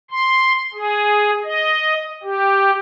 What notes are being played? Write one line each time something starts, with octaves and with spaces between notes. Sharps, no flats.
C6
G#4
D#5
G4